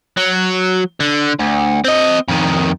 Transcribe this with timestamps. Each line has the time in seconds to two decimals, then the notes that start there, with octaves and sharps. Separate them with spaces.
0.17 F#3
1.00 D3
1.39 D2
1.84 C4 D#5
2.28 F2 D#3